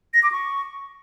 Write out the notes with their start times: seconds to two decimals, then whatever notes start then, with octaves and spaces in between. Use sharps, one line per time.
0.14 A#6
0.23 D6
0.32 C#6